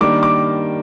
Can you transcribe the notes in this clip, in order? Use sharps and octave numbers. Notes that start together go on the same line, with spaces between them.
D#3 G3 A#3 D4 D6
D6